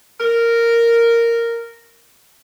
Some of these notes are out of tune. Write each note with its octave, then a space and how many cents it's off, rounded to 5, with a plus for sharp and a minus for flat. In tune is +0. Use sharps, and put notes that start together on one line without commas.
A#4 -5